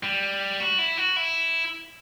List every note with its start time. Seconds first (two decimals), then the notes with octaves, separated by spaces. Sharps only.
0.03 G3
0.60 F#4
0.79 E4
0.98 F#4
1.16 E4